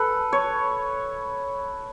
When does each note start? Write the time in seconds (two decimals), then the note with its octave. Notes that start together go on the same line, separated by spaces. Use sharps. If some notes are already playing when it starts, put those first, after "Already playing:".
Already playing: A4 B4
0.33 C#5